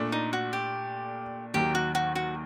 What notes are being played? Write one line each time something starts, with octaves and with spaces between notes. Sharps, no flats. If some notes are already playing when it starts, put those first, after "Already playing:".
Already playing: A#2 A3 D4
D#4
F#4
G4
D#2 D#3 F#3 G4
F#4
F#4
F#4